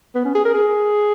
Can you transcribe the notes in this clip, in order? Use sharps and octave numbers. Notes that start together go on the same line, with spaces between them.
B3
C#4
G#4
A#4
G#4